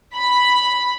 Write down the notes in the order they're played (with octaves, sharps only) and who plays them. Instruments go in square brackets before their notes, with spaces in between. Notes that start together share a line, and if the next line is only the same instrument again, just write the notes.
[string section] B5